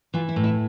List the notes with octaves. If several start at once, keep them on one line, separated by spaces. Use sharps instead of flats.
E3 F4
E4
A2
E4